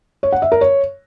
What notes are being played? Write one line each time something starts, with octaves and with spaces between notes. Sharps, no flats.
C#5
F#5
E5
A#4
C#5